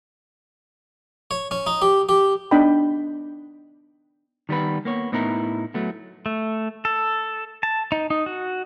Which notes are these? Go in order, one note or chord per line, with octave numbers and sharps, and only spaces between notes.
C#5
C#4
D#4
G4
G4
B3 D4 D#4 D#5 G5 B5
D#3 G3 B3 B4
A#3 B3 C#5
A2 B3 D#4 E4 A#4
F#3 A3 B3
A3
A4
A5
D#4
D#4
F#4